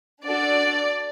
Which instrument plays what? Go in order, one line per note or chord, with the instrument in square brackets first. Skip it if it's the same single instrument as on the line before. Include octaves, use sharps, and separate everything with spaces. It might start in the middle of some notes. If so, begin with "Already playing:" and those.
[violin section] D4 F#4 A4 D5